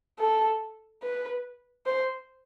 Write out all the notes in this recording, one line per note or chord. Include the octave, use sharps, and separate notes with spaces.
A4
B4
C5